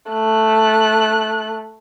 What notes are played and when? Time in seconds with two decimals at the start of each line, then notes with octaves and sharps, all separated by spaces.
0.12 A3 F#6